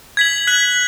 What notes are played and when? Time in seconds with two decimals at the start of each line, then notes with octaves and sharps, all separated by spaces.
0.17 G#6 B6 F#7
0.47 F#6 B6 F#7